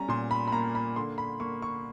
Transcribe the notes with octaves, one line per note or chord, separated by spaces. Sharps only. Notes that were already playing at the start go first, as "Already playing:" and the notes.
Already playing: G3 C#4 A#5
A#2 C6
B5
B5
A#3 A#5
B5
D3 C6
B5
A#3 C#6
C#6